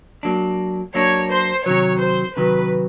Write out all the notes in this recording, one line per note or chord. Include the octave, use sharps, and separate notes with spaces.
F#3 A#3 D4
F#3 A#3 D4 C#5
C5
C3 D#3 F#3 C#5
C5
C3 D#3 F#3 B4